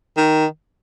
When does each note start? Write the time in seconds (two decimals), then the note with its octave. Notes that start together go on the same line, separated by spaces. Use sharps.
0.17 D#3